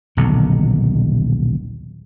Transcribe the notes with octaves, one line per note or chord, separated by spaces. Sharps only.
D#1 B1 D3